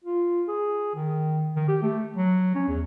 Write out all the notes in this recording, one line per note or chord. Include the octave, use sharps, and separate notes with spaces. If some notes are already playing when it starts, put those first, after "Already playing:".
F4
G#4
D#3
D#3
G4
A3
F#3
C#4
E2